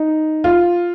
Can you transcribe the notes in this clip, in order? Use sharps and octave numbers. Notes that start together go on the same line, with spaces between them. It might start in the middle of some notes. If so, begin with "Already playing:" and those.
Already playing: D#4
F4